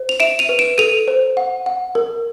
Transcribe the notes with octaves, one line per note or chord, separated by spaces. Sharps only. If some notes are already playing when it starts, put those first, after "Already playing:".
Already playing: C5
F7
E5 D7 E7
D#7 F7
B4
D7 E7
A4 D#7 F7
C5
F#5
F#5
A#4